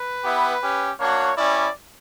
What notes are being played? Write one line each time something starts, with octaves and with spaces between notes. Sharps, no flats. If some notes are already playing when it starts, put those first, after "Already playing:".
Already playing: B4
B3 E4 G4
C#4 G4
A#3 D4 F#4 C#5
G3 C#4 E4 D5